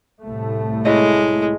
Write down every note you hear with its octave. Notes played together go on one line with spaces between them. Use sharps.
C2 A2 A3
G#3 E4 C#5 D#5